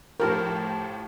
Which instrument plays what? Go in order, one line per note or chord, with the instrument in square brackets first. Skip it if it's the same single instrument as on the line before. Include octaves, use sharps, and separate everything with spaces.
[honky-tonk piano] A2 F3 G4 [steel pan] A#4